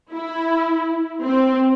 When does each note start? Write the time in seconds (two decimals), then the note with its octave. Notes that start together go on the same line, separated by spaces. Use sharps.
0.11 E4
1.23 C4